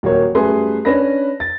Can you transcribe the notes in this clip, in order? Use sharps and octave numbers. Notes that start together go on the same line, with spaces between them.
D#1 F#3 A#3 G4 C#5
F#2 G3 A3 G#4 B4 C6
C#4 D4 B4 B5 A#6
A6